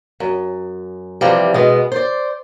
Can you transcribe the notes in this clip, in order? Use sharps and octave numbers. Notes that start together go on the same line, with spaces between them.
F#2
C3 E3 F3 G3
B2 G#3 B3
C5 D5